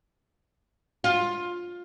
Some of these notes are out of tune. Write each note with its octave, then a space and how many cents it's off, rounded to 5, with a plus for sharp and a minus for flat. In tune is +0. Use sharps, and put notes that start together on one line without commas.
F4 +15